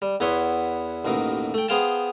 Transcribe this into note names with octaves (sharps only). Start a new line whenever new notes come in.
G3
E2 B3 E4 B4 C#5 C6
A1 D#2 B2 D#3
A3 G5
B3 G#4 C5 F5 G5 A5